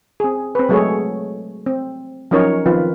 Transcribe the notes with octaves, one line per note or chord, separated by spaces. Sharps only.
C4 G#4
C4 B4
F#3 G#3 A3 G#4 A4 C#5
C4
F3 F#3 C#4 D#4 A#4 C#5
D#3 F3 C4 F4 B4